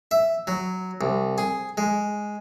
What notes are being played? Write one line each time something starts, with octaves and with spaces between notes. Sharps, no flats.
E5
F#3
C2
G#4
G#3